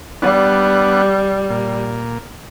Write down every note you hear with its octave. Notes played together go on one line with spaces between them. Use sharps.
G3 B3 D4 F#5
A#2